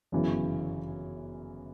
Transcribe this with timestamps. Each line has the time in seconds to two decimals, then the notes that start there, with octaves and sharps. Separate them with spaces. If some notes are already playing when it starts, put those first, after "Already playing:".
0.12 G1 F#2 C#3 E3